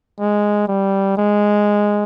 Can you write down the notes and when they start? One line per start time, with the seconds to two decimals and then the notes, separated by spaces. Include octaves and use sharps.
0.20 G#3
0.68 G3
1.18 G#3